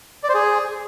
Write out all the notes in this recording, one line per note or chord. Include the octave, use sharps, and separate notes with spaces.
D5
C5
G#4